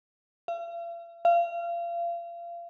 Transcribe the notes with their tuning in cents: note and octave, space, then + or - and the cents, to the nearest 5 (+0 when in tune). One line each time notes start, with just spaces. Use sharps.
F5 -45
F5 -30